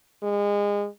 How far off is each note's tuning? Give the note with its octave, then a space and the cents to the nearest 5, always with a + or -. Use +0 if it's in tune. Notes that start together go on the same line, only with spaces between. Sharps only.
G#3 -30